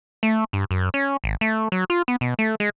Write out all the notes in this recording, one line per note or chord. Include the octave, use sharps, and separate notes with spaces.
A3
G2
F#2
C#4
G#1
A3
F#3
F4
B3
B2
A3
G#3